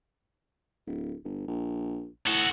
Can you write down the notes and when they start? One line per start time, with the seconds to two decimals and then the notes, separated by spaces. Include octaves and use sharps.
0.87 D1
1.24 G1
1.48 A#1
2.27 A2 F#4 A4